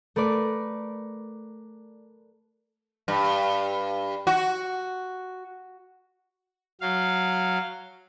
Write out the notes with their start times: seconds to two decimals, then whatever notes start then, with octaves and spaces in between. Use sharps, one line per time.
0.16 A3 A#4 B4 D5
3.08 G2
4.27 F#4
6.81 F#3 F5